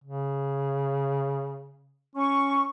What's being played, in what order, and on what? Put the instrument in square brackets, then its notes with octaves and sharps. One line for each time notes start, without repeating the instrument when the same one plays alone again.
[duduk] C#3
[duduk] C#4 [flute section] C#6